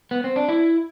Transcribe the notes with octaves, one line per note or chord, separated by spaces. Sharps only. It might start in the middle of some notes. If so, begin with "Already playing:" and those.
B3
C4
D4
E4